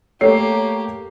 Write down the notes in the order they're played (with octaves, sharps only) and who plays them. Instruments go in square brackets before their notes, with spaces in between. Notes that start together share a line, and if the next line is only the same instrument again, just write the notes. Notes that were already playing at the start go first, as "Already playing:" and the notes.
[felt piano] A3 C#5 C7 [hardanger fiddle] A#3 G4